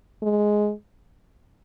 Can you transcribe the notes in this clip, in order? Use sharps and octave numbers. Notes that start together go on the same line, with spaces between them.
G#3